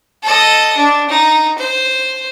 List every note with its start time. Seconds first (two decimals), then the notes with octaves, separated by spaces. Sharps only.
0.23 A4 D#5
0.77 D4
1.09 D#4
1.58 C5